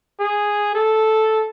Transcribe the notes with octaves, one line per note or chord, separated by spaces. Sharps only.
G#4
A4